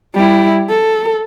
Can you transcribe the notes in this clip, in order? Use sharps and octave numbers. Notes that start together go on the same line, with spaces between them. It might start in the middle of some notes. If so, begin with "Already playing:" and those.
G3 E4
A4